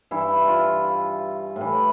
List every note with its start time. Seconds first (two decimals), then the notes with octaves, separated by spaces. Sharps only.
0.11 G2 E3 E4
0.47 F4
1.56 A2 E3